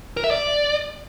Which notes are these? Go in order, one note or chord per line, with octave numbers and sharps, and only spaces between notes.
A#4
E5
D5